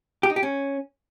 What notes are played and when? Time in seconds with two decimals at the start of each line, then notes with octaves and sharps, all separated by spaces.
0.23 G4
0.30 D#4
0.36 G4
0.43 C#4